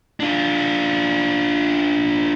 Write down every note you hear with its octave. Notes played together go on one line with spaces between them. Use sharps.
D4 F4